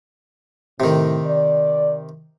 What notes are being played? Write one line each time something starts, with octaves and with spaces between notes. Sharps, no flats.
A2 C3 D#3
D5